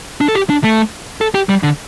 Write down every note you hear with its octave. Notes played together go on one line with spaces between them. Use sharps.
D4
A4
G4
D4
A3
A4
G4
G3
D3